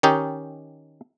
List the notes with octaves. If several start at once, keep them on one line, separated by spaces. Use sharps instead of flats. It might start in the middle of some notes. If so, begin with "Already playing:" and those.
D#3 C#4 D#4 G4